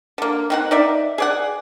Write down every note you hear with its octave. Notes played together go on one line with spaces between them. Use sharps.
D3 A#3
D#3 C4 F#5
D#4 D5 E5
G#4 D5 F#5